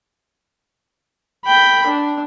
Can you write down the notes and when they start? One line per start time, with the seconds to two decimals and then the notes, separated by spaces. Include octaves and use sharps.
1.45 G5 B5
1.87 D4